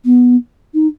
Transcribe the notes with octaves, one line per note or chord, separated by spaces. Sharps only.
B3
D#4